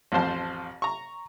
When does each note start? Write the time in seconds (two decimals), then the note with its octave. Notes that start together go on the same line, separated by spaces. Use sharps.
0.12 A1 F2 C5 A5
0.82 A#5 C#6